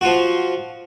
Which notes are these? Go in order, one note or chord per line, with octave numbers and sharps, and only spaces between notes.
F3 F4 F#4